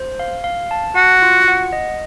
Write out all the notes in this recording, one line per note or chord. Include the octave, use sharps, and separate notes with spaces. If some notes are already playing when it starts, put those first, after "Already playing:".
Already playing: C5
F5
F5
A5
F#4 F#5
F4
F#5
D#5